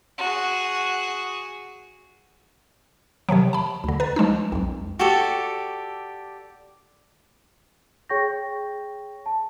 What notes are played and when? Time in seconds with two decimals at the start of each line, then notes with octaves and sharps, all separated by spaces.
0.18 F#4 G#4
3.29 C3 D#3 F3 F#3
3.53 A5 B5
3.84 D2 D3
4.00 B4 A#5 A6
4.16 F3 G#3 D4 D#4
4.52 B1 F2
4.99 F#4 G4 A4 D5
8.09 G#4 C#5 G5 C#6 G6 A#6
9.26 A5